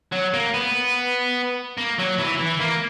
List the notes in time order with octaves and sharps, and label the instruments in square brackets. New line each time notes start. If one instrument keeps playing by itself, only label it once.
[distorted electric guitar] F#3
A#3
B3
A#3
F#3
E3
E3
A#3